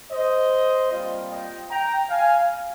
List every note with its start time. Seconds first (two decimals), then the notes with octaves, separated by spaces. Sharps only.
0.11 C5 D#5
0.92 A#2 G3 C4 F4
1.31 D#5 G5
1.70 G5 A#5
2.10 F5 G#5